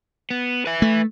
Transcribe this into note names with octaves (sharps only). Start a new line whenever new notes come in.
B3
B4 E5
A3